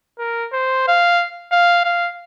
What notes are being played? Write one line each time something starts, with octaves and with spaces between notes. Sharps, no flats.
A#4
C5
F5
F5
F5